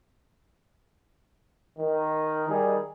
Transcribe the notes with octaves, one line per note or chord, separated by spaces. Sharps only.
D#3
D#3 G3 D#4 G#4